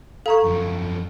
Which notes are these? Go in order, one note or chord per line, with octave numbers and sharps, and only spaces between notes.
A4 F5 A#5 C#6
F#2 F3